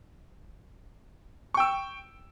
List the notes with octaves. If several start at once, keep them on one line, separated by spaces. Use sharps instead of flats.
G5 C#6 E6